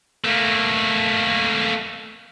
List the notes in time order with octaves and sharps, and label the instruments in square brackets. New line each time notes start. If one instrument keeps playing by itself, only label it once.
[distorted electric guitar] A3 A#3